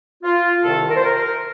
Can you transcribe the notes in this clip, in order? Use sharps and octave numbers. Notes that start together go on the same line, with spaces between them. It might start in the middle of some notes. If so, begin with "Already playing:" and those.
F4
C2 C3 D#3 A4
A#4
C5
A#4
A#4